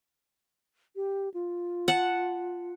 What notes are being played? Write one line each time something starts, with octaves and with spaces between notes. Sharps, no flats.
G4
F4
F#5 A5